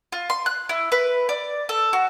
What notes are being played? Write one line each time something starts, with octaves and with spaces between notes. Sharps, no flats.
F4
C6
F#6
E4
B4
D5
A4
F#4